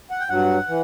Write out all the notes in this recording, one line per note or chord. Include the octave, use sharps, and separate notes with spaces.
F#5
G5
G2 F#3 F#5
E3